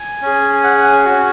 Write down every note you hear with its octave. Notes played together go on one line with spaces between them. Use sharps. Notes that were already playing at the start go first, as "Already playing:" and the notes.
Already playing: G#5
C#4 G#4
G#5
F#5
F#5
G#5
C#4 F#4